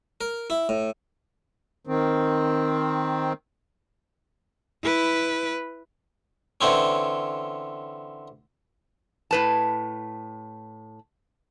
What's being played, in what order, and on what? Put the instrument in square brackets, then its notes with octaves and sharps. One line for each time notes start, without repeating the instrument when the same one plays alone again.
[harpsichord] A#4
E4
A2
[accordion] D#3 C4
[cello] E4 B4
[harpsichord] D3 E3 C4 C#4
[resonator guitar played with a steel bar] A2 B4 A5